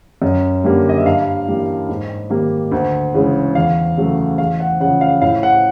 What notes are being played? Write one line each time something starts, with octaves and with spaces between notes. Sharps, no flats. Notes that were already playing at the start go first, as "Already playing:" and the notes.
F#2
D3 G3 A#3
D#5
E5
G2 F5
E3 G3 A#3
G#2
D#3 G3 A#3
D2
C#3 E3 G#3
E2 F5
C#3 F#3 A3
E2 F5
F#5
C#3 F#5
F3
F5
A2 F5
F#5